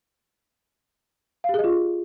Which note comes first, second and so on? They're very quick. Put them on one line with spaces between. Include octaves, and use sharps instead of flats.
F5 G4 G#4 D#5 F4